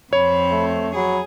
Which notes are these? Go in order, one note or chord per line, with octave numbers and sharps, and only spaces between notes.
F2 C4 C#5 B5
A3
F#3 G#4 B5